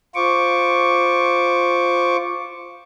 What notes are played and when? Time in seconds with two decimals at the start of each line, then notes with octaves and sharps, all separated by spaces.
0.15 F4 C5 C#6 D6